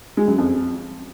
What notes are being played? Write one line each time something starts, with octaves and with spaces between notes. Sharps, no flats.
G#3
F#2
F2